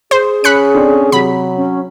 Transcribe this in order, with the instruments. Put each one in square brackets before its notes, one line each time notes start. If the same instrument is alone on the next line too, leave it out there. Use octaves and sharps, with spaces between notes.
[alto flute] G#4 [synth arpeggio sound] C5
[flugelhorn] C#4 [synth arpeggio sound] B5 F#6 C#7
[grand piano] C4 D4 A4
[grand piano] C3 [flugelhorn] F#3 [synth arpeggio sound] B5
[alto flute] C#4